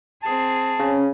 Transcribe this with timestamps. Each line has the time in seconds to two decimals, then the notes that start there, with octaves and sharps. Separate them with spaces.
0.23 C4 G#4 A5
0.79 C#3 C#4